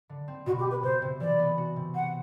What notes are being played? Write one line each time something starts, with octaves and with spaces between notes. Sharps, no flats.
D3
C4
B2 F#4
G4
B3
B4
C3 C5
C3
E3 D5
B3
F#4
C3
C4 F#5